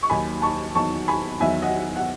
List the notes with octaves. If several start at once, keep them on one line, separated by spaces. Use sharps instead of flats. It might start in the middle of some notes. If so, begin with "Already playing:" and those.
C#6
D#2 D#3 F#3 G#5 B5
A5 C#6
E2 D#3 F#3 A5 C#6
G#5 B5
E2 D#3 F#3 E5 G#5
D#5 F#5
F#5